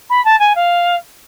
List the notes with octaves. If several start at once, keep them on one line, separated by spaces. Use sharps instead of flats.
B5
A5
G#5
F5